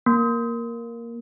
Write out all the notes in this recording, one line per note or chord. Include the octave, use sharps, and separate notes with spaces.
A#3